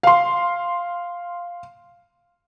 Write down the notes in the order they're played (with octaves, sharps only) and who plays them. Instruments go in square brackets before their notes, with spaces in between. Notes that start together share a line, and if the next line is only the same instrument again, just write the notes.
[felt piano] F5 C6